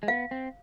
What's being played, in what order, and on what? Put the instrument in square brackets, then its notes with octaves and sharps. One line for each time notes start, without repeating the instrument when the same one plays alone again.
[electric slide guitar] G#3
[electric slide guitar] B3 [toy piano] F5
[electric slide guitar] C4